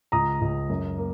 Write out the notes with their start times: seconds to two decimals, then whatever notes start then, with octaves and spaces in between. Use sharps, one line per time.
0.12 C#2 A#5 D#6
0.41 C#2
0.69 F#2
0.98 A#3